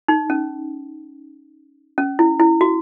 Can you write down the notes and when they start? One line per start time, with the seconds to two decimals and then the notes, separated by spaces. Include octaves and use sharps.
0.08 D#4
0.30 C#4
1.98 C#4
2.19 E4
2.40 E4
2.61 F#4